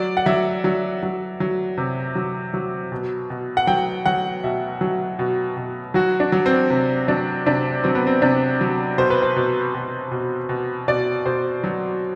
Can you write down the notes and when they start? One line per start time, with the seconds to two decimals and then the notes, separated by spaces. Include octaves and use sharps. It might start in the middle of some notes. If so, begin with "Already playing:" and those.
Already playing: F#3 D5
0.17 F#5
0.26 F#3 E5
0.64 F#3
1.03 F#3
1.40 F#3
1.77 C3
2.15 F#3
2.54 F#3
2.92 B2
3.30 B2
3.57 F#5
3.67 F#3 G5
4.06 F#3 F#5
4.44 B2 E5
4.81 F#3
5.19 B2
5.57 B2
5.94 F#3 F#4
6.20 D4
6.32 F#3
6.46 C4
6.70 C3
7.08 F#3 D4
7.46 C3 D4
7.84 F#3 C4
7.95 B3
8.07 C4
8.22 C3 D4
8.61 F#3
8.98 B2 C5
9.10 B4
9.22 C5
9.36 B2
9.74 B2
10.12 B2
10.49 B2
10.88 B2 D5
11.26 B2 C5
11.64 F#3